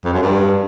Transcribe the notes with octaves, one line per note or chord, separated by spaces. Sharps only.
F2
F#2
G2